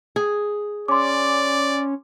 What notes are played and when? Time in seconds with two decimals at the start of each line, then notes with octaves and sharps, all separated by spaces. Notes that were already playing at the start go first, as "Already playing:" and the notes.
0.16 G#4
0.88 C#4 D5 C6 D6